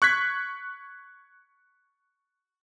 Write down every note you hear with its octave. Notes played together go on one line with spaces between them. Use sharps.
C#6 F#6 G#6 B6